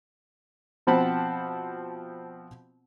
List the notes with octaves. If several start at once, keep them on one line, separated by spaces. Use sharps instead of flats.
B2 F3 C4 F#5 A5 B5